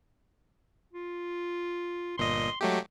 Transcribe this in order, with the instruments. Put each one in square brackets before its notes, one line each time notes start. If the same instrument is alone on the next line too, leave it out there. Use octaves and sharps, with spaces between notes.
[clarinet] F4
[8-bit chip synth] G1 A#2 D#5 [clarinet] C6
[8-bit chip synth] F#3 A3 G4 [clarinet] G#3